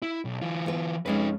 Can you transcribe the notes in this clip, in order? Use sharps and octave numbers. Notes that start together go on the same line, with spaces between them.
E4
B1
E3 F4
B3 B4
F2 G#3 C#4 D#4 B4